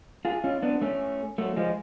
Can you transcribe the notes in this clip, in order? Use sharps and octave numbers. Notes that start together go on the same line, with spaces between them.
F4 G#4
C#4 F4
B3 D4
A3 C#4
F#3 A3
F3 G#3